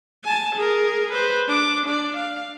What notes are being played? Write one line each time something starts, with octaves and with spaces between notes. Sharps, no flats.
G#5 A5
G#4 A#4
B4 C5
D4 D6
D4 D5
F5